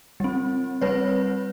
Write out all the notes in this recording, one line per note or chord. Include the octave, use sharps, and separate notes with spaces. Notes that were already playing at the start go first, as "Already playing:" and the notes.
G3 C4
G3 C4 B4 C#5